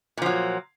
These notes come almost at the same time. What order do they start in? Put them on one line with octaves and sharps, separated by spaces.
A#2 F3 F#3